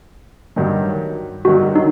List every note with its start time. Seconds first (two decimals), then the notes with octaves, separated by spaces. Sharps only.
0.56 G2 D#3 F#3
1.45 G2 D#3 F#3 F#4
1.76 D#4